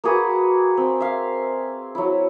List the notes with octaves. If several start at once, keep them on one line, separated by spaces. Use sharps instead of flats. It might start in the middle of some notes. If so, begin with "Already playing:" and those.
A#3 F#4 G#4 B4
C4
E5 F5
F#3 E4